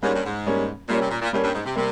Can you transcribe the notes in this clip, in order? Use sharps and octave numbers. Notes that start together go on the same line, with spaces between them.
G#2 G3 A#3 C#4
G2
G#2
G3 A#3 C#4
A#2 G3 A#3 C#4
C3
A#2
A#2
G2 G3 A#3 C#4
G2
G#2
C3
C3 G3 A#3